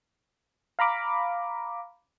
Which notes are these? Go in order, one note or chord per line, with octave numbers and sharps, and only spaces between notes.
F5 A#5 B5 D6